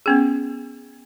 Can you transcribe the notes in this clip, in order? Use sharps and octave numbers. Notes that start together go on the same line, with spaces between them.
B3 C#4 G#4